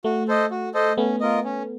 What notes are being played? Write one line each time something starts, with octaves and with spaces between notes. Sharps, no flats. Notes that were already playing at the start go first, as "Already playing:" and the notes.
A3 F#4
A4 C5 D#5
F#4
A4 C5 D#5
A3 B3 C#4
F4 A#4 D#5
C#4